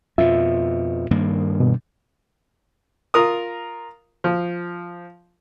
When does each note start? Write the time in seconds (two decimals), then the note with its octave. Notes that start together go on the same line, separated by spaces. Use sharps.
0.18 F2 B2 F4 E5
1.11 G2 D#3 A#3
1.60 B2
3.14 F4 A#4 D#6
4.24 F3